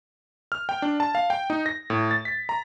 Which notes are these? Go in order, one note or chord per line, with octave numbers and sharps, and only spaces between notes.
F6
G5
D4
A5
F5
G5
D#4
A#6
A2
A6
B6
A#5